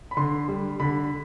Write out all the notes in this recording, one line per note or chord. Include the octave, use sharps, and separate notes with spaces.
B5
D3 C6
G3
D3 B5